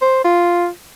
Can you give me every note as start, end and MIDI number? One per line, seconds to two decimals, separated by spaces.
0.01 0.24 72
0.24 0.67 65